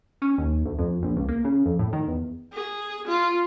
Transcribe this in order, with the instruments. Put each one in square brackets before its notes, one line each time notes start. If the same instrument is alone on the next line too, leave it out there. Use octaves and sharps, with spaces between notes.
[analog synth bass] C#4
D#2
D2
F2
A#1
C#2
A#3
C#3
F2
A2
D#3
E2
[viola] G#4
F4